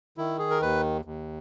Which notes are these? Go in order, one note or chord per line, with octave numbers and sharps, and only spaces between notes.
D#3 E4
G#4
A#4
D#2 B4
D#2